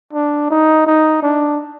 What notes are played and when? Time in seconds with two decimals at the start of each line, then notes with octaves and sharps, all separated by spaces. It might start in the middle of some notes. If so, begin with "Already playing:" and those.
0.13 D4
0.51 D#4
0.86 D#4
1.23 D4